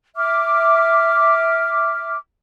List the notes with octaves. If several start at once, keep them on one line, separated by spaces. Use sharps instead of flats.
E5 D6 F6